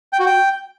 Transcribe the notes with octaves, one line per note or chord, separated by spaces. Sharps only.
G5
F#4
G5